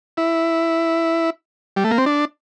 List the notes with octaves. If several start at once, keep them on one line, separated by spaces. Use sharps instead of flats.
E4
G3
A3
A#3
C4
D4